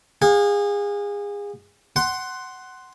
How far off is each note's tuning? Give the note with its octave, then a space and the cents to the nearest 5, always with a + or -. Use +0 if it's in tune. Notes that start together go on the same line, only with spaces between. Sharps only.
G#4 -30 F5 +40
F#5 +15 C6 +0